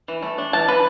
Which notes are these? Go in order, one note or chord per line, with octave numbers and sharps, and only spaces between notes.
E3
A3
D4
E3 A5
E3 B4